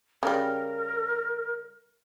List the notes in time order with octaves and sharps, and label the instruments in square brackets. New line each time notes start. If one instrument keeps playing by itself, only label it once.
[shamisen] C#3 G3 [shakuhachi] A#4